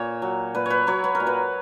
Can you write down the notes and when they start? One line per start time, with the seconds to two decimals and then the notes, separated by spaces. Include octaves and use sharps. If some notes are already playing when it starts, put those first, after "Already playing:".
Already playing: A#2 C#5
0.22 F#3
0.55 A#2 B4
0.66 B4 C#5
0.87 F#3 C#5
1.04 B4
1.15 A#4
1.20 A#2
1.27 B4